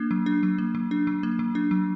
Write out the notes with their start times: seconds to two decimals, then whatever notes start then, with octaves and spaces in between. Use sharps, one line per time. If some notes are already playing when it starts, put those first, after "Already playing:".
Already playing: A#3 D4
0.11 F#3
0.26 D4
0.43 F#3
0.58 A#3
0.75 F#3
0.91 D4
1.07 F#3
1.23 A#3
1.39 F#3
1.55 D4
1.71 F#3